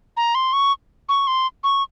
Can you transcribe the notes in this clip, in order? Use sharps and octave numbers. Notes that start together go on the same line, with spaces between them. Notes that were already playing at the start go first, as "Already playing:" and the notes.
A#5
C6
C#6
C#6
C6
C#6